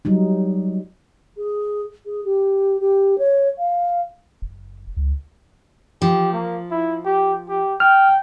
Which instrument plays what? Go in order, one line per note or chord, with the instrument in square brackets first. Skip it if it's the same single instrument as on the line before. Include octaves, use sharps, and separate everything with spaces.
[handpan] F#3 G3 D#4
[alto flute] G#4
G#4
G4
G4
C#5
F5
[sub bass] F#1
C#2
[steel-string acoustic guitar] F3 [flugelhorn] G4
[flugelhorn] A#3
E4
G4
G4
[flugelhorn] G5 [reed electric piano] F6